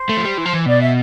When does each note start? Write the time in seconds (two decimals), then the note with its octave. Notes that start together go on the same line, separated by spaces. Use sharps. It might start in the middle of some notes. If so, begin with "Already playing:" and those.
Already playing: C5
0.09 A3
0.17 F3
0.24 G3
0.38 E3
0.46 F3
0.53 E3
0.66 B2 D5
0.81 E5